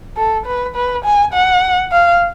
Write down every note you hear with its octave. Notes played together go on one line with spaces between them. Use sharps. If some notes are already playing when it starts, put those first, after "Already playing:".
A4
B4
B4
G#5
F#5
F5